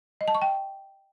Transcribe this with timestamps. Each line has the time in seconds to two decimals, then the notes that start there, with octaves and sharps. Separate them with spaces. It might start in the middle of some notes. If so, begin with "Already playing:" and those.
0.21 D#5
0.28 A5
0.35 C#6
0.42 G5